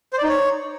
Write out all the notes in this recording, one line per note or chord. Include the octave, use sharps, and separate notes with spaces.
C5
D5
D#4
C#5